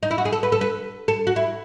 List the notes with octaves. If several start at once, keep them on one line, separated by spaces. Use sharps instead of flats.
D#4
E4
F#4
G#4
A4
B4
A4
B4
A4
F#4
E4